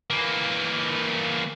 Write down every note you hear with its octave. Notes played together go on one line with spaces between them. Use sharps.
E3 A#3